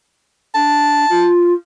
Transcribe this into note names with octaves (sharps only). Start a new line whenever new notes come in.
D4 A5
F4